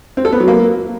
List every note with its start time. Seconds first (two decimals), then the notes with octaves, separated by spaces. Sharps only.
0.17 C4
0.25 A4
0.32 B3
0.40 F#3
0.48 A#3